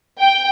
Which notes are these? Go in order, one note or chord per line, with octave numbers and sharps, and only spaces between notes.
G5